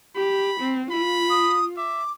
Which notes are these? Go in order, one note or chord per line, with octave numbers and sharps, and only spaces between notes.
G4 B5
C4
F4 B5
D#6
E5 D6